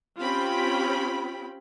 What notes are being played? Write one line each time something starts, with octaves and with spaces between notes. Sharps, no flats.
C4 C#4 F4 G4 G5 B5